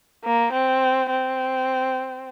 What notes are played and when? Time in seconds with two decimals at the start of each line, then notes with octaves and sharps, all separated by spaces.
0.25 A#3
0.53 C4
1.10 C4